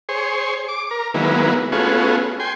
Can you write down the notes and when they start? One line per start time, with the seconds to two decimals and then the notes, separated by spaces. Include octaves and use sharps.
0.09 G#4 C5 C#5
0.68 D6
0.91 A#4
1.14 D#3 F#3 G#3 A#3 B3 E4
1.72 A3 B3 C#4 F4 F#4 G#4
2.40 G5 G#5 C6